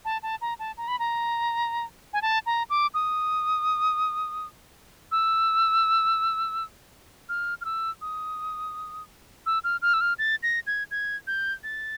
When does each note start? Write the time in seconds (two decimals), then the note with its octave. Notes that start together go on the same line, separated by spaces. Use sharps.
0.05 A5
0.23 A5
0.41 A#5
0.59 A5
0.77 A#5
0.88 B5
0.99 A#5
2.13 G#5
2.22 A5
2.46 A#5
2.70 D6
2.94 D#6
5.12 E6
7.29 F6
7.61 F6
7.65 E6
8.01 D#6
9.46 E6
9.64 F6
9.82 F6
9.94 E6
10.01 F6
10.19 A6
10.43 A#6
10.67 G#6
10.91 G#6
11.27 G6
11.64 A6